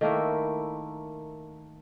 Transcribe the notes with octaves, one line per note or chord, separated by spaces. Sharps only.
D#3 A3 A#3 E4